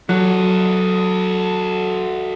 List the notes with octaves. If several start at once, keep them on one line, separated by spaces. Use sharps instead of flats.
F#3 F#4 A4